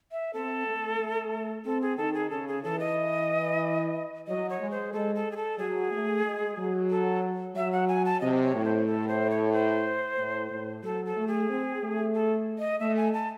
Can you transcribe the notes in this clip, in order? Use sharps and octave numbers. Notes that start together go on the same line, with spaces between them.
E5
C4 A4
A3
A3
C4 A4
G#4
D#3 A4
G#4
C#3 A4
G#4
E3 A4
D#5
F#3 D#5
C#5
G#3
C5
G#3 A4
A4
G#4
A4
F#3 G#4
A3
G#3
F#3
A4
F#3 E5
F#5
G#5
A5
C3 D#5
C#5
A2
C5
A4
C5
C#5
C5
A2
A2
F#3 A4
A4
A3
G#4
C4
A3
A4
D#5
A3 E5
G#5
A5